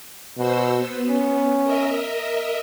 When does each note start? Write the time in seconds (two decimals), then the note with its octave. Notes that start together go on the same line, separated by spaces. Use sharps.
0.37 B2 F#4 C5 E6
0.77 B3
1.09 C#4
1.63 A#4 D#5 E5